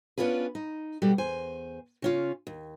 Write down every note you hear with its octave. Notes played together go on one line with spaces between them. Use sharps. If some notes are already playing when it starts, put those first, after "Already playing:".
B3 C#4 D4 F4 G#4 B4
D#4
B2 G3 F#4 G4 A4
E2 C5 G#5
C#3 C#4 F4
D#2